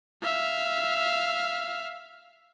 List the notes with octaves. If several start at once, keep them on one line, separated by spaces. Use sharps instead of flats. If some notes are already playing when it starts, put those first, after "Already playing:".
E5 F5